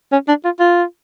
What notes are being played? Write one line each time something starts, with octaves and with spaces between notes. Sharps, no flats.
C#4
D4
F4
F4